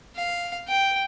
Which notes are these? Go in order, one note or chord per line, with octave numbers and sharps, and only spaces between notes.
F5
G5